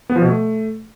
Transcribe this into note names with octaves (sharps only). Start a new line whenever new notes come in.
B3
F3
B2
A3